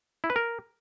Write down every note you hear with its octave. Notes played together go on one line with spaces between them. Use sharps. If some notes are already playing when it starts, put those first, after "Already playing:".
E4
B4
A#4